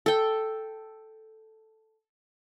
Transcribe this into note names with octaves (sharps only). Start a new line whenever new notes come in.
A4 G5